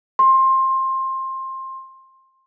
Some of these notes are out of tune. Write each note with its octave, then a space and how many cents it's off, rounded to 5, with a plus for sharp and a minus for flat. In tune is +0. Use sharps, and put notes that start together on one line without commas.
C6 +20